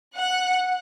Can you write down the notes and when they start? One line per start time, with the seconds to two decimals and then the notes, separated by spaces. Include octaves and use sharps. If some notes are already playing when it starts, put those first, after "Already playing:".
0.16 F#5